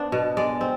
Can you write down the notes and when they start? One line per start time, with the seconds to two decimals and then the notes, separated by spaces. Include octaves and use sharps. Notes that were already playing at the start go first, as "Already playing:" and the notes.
Already playing: B3 D4 C5 D5
0.12 B2
0.37 G#3 D5
0.61 C4